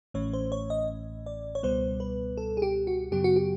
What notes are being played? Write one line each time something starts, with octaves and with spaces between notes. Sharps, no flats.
A1 A2 E3 A3 C#4 C#5
C5
C#5
D#5
D5
C#5
C#2 B2 G3 B3 C5
B4
A4
G#4
G4
F#4
F#2 C#3 F#3 B3 G4
F#4
G4